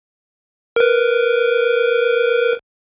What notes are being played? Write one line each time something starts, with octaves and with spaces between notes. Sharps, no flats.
A#4 B4